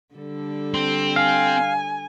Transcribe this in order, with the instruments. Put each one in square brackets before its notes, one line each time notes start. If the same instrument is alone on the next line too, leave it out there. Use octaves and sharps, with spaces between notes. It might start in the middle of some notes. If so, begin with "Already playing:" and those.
[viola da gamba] D3 G3 A4
[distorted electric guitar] C4
[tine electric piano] F5 [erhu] G#5